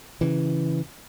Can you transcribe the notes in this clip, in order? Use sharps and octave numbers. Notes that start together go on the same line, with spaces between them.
C#3 E3